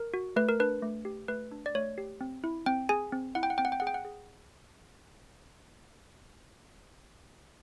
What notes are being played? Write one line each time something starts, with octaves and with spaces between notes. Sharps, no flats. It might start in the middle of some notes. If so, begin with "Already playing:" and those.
Already playing: A#4
F#4
A3 B4
A#4
D4 B4
A3
G4
A3 B4
D4
D5
A3 C#5
G4
C4
E4
C4 G5
G#4 G#5
C4
E4 F#5
G5
F#5
C4 G5
F#5
G5
G#4 F#5
G5
F#5
G#4